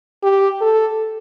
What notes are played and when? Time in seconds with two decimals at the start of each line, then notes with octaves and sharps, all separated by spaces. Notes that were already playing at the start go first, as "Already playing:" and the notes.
0.23 G4
0.61 A4